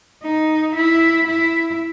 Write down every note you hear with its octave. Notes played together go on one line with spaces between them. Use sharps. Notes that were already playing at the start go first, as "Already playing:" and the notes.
D#4
E4
E4